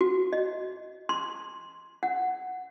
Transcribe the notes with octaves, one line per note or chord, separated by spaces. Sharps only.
F#4
D#5
C6
F#5